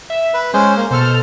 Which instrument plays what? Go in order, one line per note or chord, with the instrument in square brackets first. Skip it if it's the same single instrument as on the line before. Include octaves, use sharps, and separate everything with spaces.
[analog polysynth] E5
[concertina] B4
[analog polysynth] G#3 [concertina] C#4 C5
[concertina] A#3
[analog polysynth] B2 A4 F6 [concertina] C5